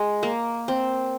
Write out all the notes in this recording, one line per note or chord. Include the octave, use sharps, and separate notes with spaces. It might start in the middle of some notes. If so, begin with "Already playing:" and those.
Already playing: G#3
A#3
C4